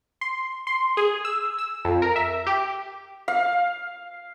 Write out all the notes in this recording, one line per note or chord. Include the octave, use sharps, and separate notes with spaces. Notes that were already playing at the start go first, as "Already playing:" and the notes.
C6
C6
G#4
E6
E6
F2
A#4
E5
G4
F5